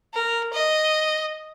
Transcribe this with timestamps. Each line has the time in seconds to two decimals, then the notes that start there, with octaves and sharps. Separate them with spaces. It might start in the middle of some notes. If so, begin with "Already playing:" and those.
0.14 A#4
0.53 D#5